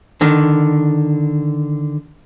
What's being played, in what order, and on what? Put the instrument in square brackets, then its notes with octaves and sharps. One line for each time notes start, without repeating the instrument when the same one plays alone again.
[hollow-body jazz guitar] D3 D#3